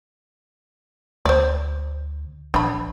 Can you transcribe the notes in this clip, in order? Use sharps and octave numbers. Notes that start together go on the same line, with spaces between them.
D2 C5 D5
A#1 D4 B5